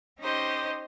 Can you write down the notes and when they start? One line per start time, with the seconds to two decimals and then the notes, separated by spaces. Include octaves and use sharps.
0.20 C#4 D#4 G4 C5 D#5